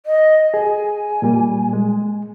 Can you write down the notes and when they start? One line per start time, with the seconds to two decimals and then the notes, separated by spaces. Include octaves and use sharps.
0.06 D#5
0.54 G#4 G#5
1.22 A#2 G3 A#3
1.73 G#3